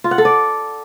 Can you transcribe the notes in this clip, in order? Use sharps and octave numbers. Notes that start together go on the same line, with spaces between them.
F4
F#5
A4
D5